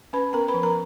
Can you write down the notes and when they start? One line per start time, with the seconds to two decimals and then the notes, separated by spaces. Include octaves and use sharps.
0.13 C#4 B4 B5
0.33 B3 A#4 A#5
0.48 B4 B5
0.54 F3
0.63 A#4 A#5